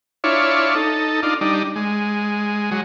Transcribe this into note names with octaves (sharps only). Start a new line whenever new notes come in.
D4 E4 F4 C#5
D#4 A4
D4 D#4 F4
G3 D4 D#4
G#3
F#3 G#3